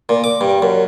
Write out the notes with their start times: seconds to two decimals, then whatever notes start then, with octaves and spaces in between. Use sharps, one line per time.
0.09 A#2
0.24 D6
0.41 G2
0.62 F#2